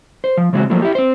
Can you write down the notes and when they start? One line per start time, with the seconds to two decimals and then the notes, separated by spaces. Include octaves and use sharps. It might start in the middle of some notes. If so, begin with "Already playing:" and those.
0.24 C5
0.37 F3
0.53 C#3 E3 G#3 C4 F4 F#4
0.70 F3 F#3 A3 A#3 F4
0.82 E4 G4
0.95 C4 C5